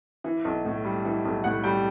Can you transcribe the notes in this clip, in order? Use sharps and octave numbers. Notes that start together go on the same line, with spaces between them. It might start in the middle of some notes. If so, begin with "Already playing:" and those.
E3
B1
A2
G3
E3
B1
A2 F#5
G3 G5